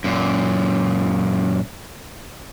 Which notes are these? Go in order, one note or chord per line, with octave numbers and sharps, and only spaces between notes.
F#2 A#2